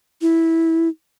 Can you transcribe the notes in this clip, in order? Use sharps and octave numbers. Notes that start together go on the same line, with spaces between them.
E4